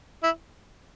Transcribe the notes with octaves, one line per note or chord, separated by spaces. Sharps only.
E4